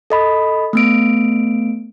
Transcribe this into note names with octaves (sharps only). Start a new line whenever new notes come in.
A4 D#5 B5
A3 B3 D7